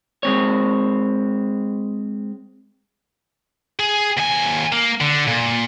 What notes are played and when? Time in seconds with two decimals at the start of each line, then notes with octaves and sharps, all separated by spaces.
0.23 G#3 C4 C#5
3.80 G#4
4.18 D#2 G#5
4.72 A#3
5.00 D3
5.27 A#2